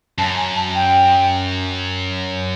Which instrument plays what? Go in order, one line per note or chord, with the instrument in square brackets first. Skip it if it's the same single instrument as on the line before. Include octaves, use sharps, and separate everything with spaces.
[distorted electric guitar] F#2 [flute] A5
[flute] G#5
A5
G5